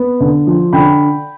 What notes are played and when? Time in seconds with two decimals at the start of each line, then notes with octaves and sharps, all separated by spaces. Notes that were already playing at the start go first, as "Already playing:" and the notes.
Already playing: B3
0.20 D3
0.47 F3
0.73 D3 G5 B5